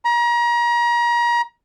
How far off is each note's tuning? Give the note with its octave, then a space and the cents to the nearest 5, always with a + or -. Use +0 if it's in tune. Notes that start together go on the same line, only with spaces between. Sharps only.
A#5 +35